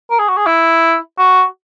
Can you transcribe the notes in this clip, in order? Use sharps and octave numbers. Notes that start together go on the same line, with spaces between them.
A#4
G#4
F#4
G#4
E4
F#4